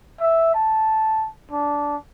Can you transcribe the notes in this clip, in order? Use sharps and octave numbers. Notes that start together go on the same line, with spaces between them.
E5
A5
D4